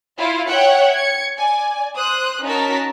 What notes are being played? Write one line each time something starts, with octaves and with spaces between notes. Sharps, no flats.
E4 F4 F5
C#5 E5 F#5 G5 F#6 C#7
G#6 C#7
D5 G#5
C5 D#6 F#6
C#4 D#4 F#4 A#4 A5 B6